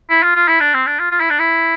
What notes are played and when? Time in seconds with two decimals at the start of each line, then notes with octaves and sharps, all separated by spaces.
0.10 E4
0.23 F4
0.35 F4
0.48 E4
0.60 D4
0.74 C4
0.86 D4
0.99 F4
1.11 F4
1.21 E4
1.30 D4
1.39 E4